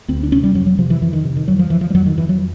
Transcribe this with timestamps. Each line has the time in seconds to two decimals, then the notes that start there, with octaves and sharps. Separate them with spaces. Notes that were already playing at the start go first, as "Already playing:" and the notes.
0.08 D2 C4
0.23 D4
0.32 C3 C#4
0.43 G3
0.55 F2 F#3
0.66 F#3
0.78 C3 F3
0.90 E3
1.02 F2 E3
1.13 D#3
1.24 C3
1.37 D#3
1.48 F2 F#3
1.59 F3
1.70 F2 E3
1.81 F3
1.90 G3
1.94 F2 F#3
2.06 D#3
2.17 F2 E3
2.29 F#3